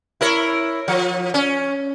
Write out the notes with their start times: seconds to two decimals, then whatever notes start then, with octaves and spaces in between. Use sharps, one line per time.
0.21 E4 A#4 C#5
0.88 F3
1.34 C#4